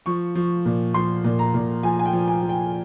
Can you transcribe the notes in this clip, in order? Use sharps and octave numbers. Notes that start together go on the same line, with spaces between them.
F3 C#6
F3
A#2
F3 C6
A#2
A#5
A#2
F3 G#5
G#5
G5
F3
G#5
F3
G5